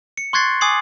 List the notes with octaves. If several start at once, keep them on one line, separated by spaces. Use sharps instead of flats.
C#7
C6 C#6 F#6 G#6 A6 C7
G#5 D6 D#6 G#6 C7 F#7